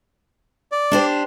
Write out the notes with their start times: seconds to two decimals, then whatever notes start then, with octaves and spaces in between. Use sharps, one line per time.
0.72 D5
0.92 D4 G4 C5